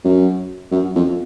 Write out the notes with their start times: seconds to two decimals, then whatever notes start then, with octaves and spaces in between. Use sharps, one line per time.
0.05 F#2
0.72 F#2
0.96 F2